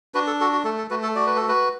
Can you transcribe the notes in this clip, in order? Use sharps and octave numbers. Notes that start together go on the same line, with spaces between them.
D4 F#4 B4
A4
F#4 A4
F#4
A3 A4
A4
A3 F#4 B4
A4
F#4 D5
B4
F#4 A4
F#4 B4